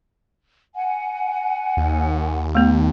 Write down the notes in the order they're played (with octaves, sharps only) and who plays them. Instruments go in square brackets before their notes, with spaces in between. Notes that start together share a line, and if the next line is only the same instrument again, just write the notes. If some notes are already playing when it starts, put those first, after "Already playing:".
[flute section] F#5 G#5
[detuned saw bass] D#2
[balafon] A3 B3